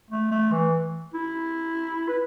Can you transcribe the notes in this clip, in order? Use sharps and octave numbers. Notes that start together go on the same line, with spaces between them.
A3
A3
E3
E4
B4